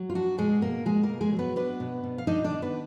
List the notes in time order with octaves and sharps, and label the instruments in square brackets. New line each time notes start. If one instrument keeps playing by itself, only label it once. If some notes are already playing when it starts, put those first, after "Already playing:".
Already playing: [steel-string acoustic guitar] F#3
F4
D4 F#4
B2 G#3 G#4
B2 A#3 A#4
B2 G#3 G#4
A#3 A#4
B2
G#3 G#4
F#3
B3 B4
B3 D4 B4
B2
B2
F5
D4 D#4 D#5
D4 D5
D#3
B3 B4